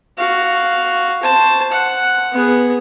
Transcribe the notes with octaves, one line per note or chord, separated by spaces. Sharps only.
F#4 F5
C5 A5
F#5
B3 G#4